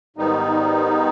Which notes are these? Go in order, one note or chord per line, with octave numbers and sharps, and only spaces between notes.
G#2 D#3 G3 B3 D#4